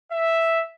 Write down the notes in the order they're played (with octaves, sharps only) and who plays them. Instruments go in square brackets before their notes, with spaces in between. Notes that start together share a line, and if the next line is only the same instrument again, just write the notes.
[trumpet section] E5